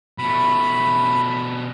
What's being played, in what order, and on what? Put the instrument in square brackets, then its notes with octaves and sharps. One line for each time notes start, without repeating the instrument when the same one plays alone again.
[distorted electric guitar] B2 A3 [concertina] B5